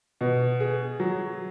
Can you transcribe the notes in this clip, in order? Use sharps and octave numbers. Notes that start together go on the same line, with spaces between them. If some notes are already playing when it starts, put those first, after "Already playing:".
B2
G#4
F#3